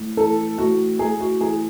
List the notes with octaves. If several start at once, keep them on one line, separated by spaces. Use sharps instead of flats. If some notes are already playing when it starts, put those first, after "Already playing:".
Already playing: A2
E3 A4
A2 F#4
A2 G#4
F#4
E3 G#4